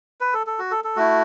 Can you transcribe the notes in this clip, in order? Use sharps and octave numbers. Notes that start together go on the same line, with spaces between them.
B4
A4
A4
F#4
A4
A4
A3 E4 F#4